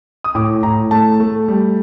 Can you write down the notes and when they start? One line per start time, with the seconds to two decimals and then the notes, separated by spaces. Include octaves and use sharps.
0.24 D#6
0.35 A2 D6
0.63 A2 A#5
0.91 A3 A5
1.20 A3
1.48 G3